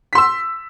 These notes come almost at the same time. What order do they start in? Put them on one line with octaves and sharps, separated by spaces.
B6 C6 E6